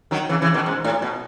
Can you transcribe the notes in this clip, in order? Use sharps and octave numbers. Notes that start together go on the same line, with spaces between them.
D#3 F#3
C#3 E3
C#3 E3
B2 D#3
G#2
A2
B2